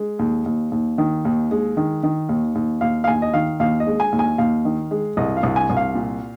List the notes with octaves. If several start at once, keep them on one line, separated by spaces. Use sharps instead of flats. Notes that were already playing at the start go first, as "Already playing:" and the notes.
Already playing: G#3
D#2
D#2
D#2
D#3
D#2
G#3
D#3
D#3
D#2
D#2
D#2 F5
F5
D#2 G#5
D#5
D#3 F5
D#2 F5
D#5
G#3
G#5
D#2
G#5
D#2 F5
D#3
G#3
C2 D#5
F5
C2
G#5
C2
F5
A#2